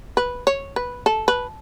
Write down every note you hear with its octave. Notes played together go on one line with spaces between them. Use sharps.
B4
C#5
B4
A4
B4